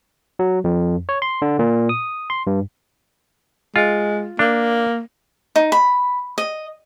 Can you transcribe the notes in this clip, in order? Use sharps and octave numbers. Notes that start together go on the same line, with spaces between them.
F#3
F2
C#5
C6
D3
A#2
D#6
C6
G2
G#3 F4
A#3 D4
D#4
B5
D#5